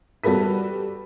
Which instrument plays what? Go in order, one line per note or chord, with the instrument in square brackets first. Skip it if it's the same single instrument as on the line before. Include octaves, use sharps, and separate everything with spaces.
[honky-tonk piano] G3 F#4 A4 B4 B6